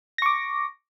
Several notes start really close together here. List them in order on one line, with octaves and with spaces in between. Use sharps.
A#6 C#6 D6